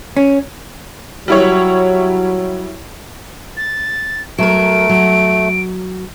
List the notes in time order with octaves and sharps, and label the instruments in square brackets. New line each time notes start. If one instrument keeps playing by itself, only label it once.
[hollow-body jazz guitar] C#4
[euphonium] F#3 [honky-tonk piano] G3 E4 C#5
[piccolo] A6
[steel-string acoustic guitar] F#3 A#4 [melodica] A3 [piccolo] D7
[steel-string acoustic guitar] F#3